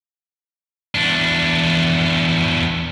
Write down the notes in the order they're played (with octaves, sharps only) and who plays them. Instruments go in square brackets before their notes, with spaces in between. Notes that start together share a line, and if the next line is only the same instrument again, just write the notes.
[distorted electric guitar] E2 D4